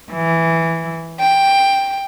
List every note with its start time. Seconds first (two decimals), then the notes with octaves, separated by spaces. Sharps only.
0.12 E3
1.21 G5